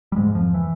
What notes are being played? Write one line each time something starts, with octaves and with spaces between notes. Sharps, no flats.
G3
G#2 G#3
F2 F3
E3